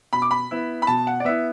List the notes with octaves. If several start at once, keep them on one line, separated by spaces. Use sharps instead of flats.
B2 B5
D6
B5
B3 E4
B5
B2 A5
F#5
D5
B3 E4 E5